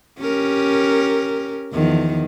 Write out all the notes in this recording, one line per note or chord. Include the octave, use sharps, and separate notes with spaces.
C#4 G4 A#4
E2 D#3 F3